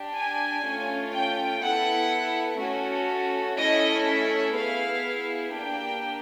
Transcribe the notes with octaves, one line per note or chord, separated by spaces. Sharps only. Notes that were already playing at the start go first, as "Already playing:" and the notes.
Already playing: D4 G4
G#5
A3 C#4 F4
G5
B3 E4 A4 F#5
A3 C#4 F#4 A4
A3 C#4 E4 A4 D#5
E5
B3 E4 G#4 F5
A#3 D4 G4 G5